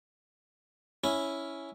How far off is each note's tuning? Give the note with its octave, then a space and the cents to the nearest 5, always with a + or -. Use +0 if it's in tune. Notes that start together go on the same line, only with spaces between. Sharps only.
C#4 +0 E4 -5